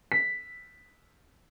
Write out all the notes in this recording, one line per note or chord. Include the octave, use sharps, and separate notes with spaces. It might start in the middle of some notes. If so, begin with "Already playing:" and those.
B6